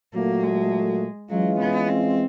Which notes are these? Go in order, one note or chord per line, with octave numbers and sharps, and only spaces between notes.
A#2 F#3 A3 A#3
G#3
E3 F#3 G#3 C#4 F4
B3
C4